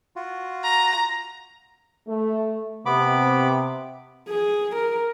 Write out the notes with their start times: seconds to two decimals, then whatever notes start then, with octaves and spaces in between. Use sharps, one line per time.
0.16 F4 F#4
0.63 A#5
2.08 A3
2.86 C3 B3 B5 D6
4.28 G#4
4.75 A#4